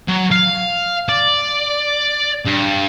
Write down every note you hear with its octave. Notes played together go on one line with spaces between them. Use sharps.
F#3
F5
D5
G2